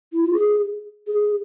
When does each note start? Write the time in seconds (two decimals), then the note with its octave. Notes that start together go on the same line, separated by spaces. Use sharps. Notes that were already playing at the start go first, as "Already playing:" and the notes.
0.13 E4
0.23 F4
0.33 G#4
1.07 G#4